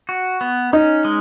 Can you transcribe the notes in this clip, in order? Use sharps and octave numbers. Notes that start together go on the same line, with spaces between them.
F#4
B3
C#4 D#4
G#3